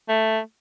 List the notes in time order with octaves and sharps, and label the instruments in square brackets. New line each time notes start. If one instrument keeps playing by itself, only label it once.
[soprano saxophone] A3